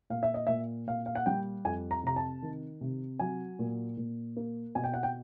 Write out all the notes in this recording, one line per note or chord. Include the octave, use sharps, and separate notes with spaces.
A#2 F5
E5
D#5
A#2 E5
A#2 F5
F5
F#5
G3 G5
F2 G#5
A#5
C3 A#5
A5
D#3
C3
F#3 G#5
A#2
A#2
A#3
B2 G#5
G5
F#5
G5